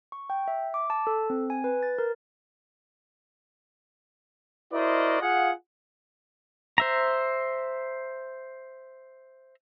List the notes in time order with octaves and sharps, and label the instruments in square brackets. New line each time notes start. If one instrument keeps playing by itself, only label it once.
[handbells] C#6
G5
E5
D6
A5
A4
C4
G#5
B4
A6
A#4
[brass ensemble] E4 F#4 A#4 C5 D5 D#5
F4 G#4 F5 F#5
[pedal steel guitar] C5 E5 A#5